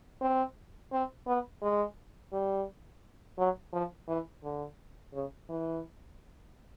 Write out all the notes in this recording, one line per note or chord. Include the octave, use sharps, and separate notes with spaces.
C4
C4
B3
G#3
G3
F#3
F3
E3
D3
C#3
E3